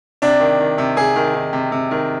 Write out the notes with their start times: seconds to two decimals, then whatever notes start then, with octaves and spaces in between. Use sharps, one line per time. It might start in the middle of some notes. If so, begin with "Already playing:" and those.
0.22 C3 D4 D5
0.40 D#3
0.60 D#3
0.78 C3
0.96 C3 G#4 G#5
1.16 D#3
1.35 D#3
1.53 C3
1.72 C3
1.91 D#3